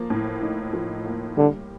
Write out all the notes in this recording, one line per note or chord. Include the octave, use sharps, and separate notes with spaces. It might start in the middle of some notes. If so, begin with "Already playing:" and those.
Already playing: F3 A#3
A2
D#4
F3
A#3
D3 G3